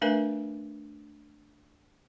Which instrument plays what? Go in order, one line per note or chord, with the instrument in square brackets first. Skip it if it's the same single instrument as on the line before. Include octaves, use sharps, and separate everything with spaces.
[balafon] A3 D4 A#4 B4 E5 G#5